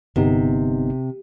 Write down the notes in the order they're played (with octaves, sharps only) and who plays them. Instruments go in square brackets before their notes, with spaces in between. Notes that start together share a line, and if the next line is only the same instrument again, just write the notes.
[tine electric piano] G1 B3 D#4 [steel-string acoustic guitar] C3